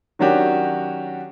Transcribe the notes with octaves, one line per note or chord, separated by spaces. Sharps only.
D#3 F#3 C#4 D4 F#4 G4